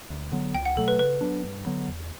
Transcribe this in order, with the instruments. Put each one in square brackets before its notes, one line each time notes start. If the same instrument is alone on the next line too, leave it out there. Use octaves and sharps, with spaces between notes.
[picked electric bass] D2
D3 F#3 B3
[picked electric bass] C#2 [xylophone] G5
[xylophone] F#5
[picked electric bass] B2 F#3 A3 [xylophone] A4
[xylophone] B4
[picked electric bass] C#3 [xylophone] B4
[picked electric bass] F#3 B3 D4
G2
D3 F#3 B3
E2